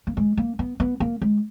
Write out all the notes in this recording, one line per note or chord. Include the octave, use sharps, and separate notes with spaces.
A#3
G#3
A#3
B3
B3
A#3
G#3